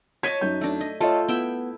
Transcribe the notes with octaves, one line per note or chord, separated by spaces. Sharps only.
C#5 D#5 A5 G#6 B6 D#7
F#2 D#4 G6
A3 D4
D#5
A3 F4 A4 C#5 D#5 A5
B3 E4 E5 G5